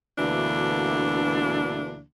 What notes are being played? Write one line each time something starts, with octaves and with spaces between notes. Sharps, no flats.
D2 B2 D3 E3 A#3 D4